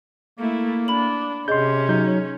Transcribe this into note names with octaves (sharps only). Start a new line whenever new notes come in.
A3 A#3 E4
D4 B5 F#7
C3 C#4 G#4 D#5 C6 G6
F#3 D#4 G6